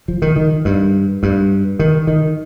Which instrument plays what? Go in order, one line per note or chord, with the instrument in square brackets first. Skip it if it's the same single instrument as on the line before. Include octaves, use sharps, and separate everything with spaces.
[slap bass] F3
D#3
D#3
G2
G2
D#3
D#3